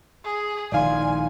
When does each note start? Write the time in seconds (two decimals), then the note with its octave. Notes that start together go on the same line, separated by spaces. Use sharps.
0.25 G#4
0.72 A#1 D#3 D5 F5 G#5 C6